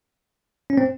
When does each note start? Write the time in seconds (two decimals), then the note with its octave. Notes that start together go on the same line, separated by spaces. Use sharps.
0.70 C#4
0.78 C4